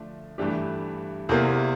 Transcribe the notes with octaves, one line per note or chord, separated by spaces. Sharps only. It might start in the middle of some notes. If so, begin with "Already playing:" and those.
Already playing: D3 F3 A3 D4
G2 E3 A3 D4 G4
E2 C3 E3 A#3